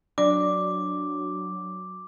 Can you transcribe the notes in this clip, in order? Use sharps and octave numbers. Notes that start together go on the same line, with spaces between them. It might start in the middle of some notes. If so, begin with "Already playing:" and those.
F#3 D4 D5 D6